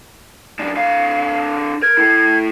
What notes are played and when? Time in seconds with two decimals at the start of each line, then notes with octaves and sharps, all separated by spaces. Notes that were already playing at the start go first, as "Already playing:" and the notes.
0.59 F#2 D4
0.76 D3 F5
1.82 A#4 G#6
1.97 E4 A4